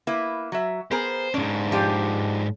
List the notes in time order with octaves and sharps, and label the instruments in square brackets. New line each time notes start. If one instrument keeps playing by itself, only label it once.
[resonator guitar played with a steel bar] A#3 E4 B4
F#3 E5
[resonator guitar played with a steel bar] B3 G#4 A#4 [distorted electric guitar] C5
[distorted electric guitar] G#2 D4 [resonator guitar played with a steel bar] C#4
[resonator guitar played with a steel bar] F3 G4 D5